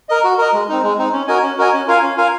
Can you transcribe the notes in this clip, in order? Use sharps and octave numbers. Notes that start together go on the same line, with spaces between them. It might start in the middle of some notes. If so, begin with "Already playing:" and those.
A#4 D#5
F#4
A#4 D#5
G#3
C4 D#4
G#3
C4 D#4
C#4
F#4 A#4 D#5 G#5
C#4
F#4 A#4 D#5 G#5
C#4
F4 A#4 F5 G#5
C#4
F4 A#4 F5 G#5